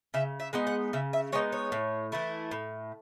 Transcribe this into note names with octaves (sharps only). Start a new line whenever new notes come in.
C#3 E5
E5
G#3 B3 D#4
F#5
C#3 E5
E5
G#3 B3 D#4 C#5
C#5
A2
E3 A3 E4
A2